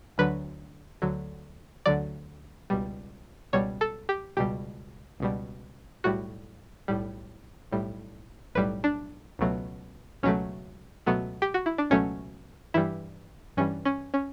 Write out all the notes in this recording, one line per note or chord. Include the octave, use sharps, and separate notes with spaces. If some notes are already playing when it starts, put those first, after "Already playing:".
D2 D3 F#3 B4
D2 D3 F#3
D2 D3 F#3 D5
C#2 B2 G3
C#2 B2 G3 C#5
A4
G4
C#2 B2 G3 G4
C#2 B2 G3
B1 A2 G3 F#4
B1 A2 G3
B1 A2 G3
B1 A2 G3 B4
D4
C#2 B2 F#3 A3
C#2 B2 F#3 A3 C#4
C#2 B2 F#3 A3 B3
G4
F#4
E4
D4
C#2 B2 F#3 A3 C#4
G2 E3 G3 E4
G2 E3 G3 C#4
C#4
C#4